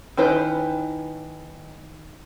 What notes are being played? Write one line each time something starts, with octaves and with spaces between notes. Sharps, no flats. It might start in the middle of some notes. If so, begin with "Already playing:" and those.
D#3 C#4 E4 B4 C5